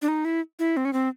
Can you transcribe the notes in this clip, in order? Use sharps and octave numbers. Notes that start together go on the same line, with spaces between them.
D4
D#4
E4
E4
C4
C#4
C4